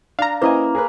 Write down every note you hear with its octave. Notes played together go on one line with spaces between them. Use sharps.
D4 F5 A#5
A#3 C#4 E4 B4 C5 D#5 G#5
G#4 A#4 B4